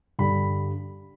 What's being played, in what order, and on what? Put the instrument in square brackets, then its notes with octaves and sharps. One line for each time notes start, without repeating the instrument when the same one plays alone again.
[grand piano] G2 D3 G3 D4 B5